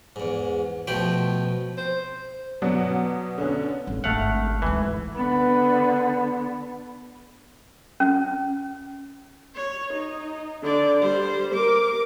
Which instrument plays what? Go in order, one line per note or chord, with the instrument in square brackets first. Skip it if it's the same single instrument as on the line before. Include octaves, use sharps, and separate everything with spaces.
[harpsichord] E2 G#2
B2 F3 A3 G5 B5 C6
[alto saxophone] C5
[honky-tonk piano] B2 F#3 D5 F#5
D3 B3 C#4
[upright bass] G#1
[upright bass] G#1 D3 [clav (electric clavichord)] A3 F5 F#5
[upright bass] D2 G#2 [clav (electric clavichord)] E3
[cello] D3 B3
[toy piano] C#4
[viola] C#5
D#4
D3 D5
G3 C5
A#4 D6